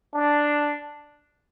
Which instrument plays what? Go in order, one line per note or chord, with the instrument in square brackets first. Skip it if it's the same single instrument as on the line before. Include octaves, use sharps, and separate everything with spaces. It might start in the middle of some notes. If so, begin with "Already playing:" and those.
[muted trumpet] D4